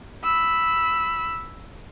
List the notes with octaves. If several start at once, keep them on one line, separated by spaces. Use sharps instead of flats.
B5 E6